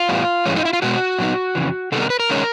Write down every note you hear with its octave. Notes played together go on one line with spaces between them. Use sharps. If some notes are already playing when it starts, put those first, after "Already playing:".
Already playing: F4
A2 E3 G3 B3
G2 E3 G#3 C#4
D#4
E4
F4
B2 G#3 B3 F#4
A#2 F#3 B3 D#4
F2 C#3 E3
C3 D#3 G3 B3 D#4 A4
A#4
B4
A#4
D#3 G#3 C#4